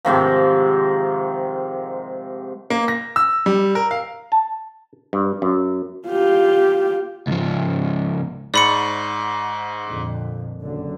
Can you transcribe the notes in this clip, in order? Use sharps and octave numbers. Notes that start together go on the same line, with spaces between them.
G#2 C3 D#3 F3
A#3
A#6
E6
G3
A#4
F5
A5
G2
F#2
F4 G4
C#2 F3
G#2 D5 B5 C#6 C#7
F2 A#2 D3
F#1 D3